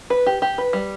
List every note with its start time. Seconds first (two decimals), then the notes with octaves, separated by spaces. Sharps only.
0.10 B4
0.26 G4
0.42 G4
0.58 B4
0.73 G3